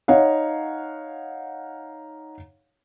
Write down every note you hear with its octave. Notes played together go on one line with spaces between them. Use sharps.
D#4 C#5 F5 F#5